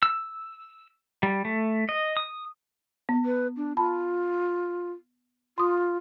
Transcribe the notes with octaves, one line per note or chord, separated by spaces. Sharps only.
E6
G3
A3
D#5
D#6
B3
B4
D4
F4 A5 B5
F4 C6 D#6